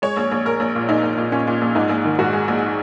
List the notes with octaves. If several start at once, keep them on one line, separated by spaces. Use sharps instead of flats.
G#3 C#5
A#1
A#1
A#1 A#4
A#1
A#2
A#1 D#4
A#1
A#2
A#2 C#4
A#2
A#1
G#2 D#4
A#1
D#3
G#2 F#4
G#3
A#1